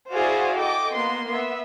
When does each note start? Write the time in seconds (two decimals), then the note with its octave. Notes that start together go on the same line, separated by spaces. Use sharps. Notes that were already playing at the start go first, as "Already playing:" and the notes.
0.13 E4 F#4 G#4 C5 D5 F5
0.57 A4 D#5 G5 D6
0.92 A#3 B3 C6
1.30 B3 E5